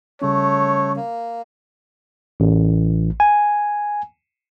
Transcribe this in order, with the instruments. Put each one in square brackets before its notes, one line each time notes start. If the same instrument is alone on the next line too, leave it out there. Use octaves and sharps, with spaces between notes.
[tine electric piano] C#3 G3 C#4 [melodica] A3 [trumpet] C#5
[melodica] A#3
[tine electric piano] A1
G#5